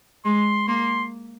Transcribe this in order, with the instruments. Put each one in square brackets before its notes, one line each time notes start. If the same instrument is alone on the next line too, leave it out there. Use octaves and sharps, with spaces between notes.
[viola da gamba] G#3 [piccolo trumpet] C6
[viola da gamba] A#3 [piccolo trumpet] C6